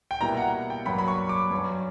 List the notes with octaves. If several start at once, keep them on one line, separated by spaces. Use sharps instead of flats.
G5
B2 G3 A#3 E4 A#5
F#5
G5
G2 F#3 A#3 D4 B5
B5
C#6
D6
G2 F#3 C#4